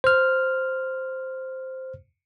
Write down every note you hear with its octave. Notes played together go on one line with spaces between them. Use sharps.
C5 F6